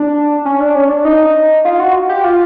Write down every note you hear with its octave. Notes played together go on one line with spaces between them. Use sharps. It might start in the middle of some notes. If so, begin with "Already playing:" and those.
Already playing: D4
C#4
D4
C#4
D4
D#4
F4
F#4
G4
F4